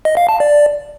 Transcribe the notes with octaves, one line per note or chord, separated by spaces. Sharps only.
D#5
F5
A5
D5